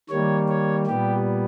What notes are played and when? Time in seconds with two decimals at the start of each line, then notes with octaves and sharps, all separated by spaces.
0.09 D#3 G3 A#3 C#5
0.48 C#5
0.86 A#2 G3 B3 G4